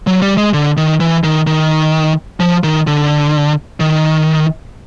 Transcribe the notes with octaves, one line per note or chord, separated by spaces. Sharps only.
F#3
G3
G#3
D3
D#3
E3
D#3
D#3
F3
D#3
D3
D#3